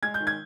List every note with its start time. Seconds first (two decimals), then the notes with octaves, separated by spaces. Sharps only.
0.02 G#3 G#6
0.14 G6
0.20 D#3
0.27 G#6